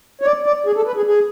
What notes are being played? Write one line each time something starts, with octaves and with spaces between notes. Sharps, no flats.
C#5
D5
D5
G#4
A4
B4
G#4
G#4